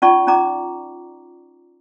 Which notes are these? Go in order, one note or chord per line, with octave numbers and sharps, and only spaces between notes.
C#4 D#4 F4 D5 A5 C#6
C#4 D#4 D5 A#5 D6